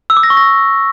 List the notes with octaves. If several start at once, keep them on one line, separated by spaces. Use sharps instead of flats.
E6
D6
A#6
C#6
A#6